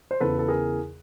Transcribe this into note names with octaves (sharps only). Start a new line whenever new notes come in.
C5
E2 C#3 E3 A4 B4
A4
G#4 A#4